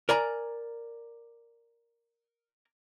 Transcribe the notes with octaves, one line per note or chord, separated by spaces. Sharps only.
A#4 D5 G#5 A#5